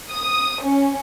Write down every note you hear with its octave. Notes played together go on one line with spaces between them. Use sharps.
D#6
C#4